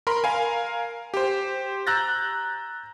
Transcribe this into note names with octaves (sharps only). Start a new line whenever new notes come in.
A#4 B5 C6
A#4 F5 G#5
G4 C5
A#5 E6 F#6 G6 A6 A#6